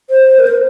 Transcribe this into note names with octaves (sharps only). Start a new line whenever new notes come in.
C5
A#4
C5